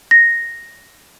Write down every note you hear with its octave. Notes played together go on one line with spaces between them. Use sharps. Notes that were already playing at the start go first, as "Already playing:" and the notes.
A#6